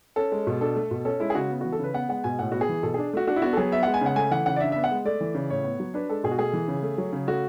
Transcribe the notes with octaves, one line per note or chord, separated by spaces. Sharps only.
C#4 A4
G#3
B2
D4 A4
A3
B2
C#4 A4
G#3 E4
G#4
C#3 F#4
B3
E3 F#4
A4
C#3 B4
B3 F#5
G#3 F#5
B2 G#5
A2 F#5
B3 F#4
G#4
E3
B2 A4
D4 G#4
A3 F#4
D4 F#4
E4
B3 F#4
A4
F#3 G#4
B3 E5
G#3 F#5
G#5
C#3 F#5
A3 G#5
E3 F#5
C#3 F#5
D5
D4 E5
B3 E5
F#5
G#3
A3 D5
E3
C#3
A2 C#5
B3
F#3
D4 B4
G#3 A4
B2 G#4
F#4
A3 G#4
E3
C#3
A3
F#3
C#3
A3 F#4